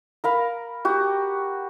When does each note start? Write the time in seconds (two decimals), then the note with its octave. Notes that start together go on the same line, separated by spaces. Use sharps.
0.24 A#4 F5 B5
0.85 F#4 G4